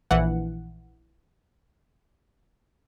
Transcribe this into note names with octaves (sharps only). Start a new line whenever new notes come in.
A#1 E3 F#5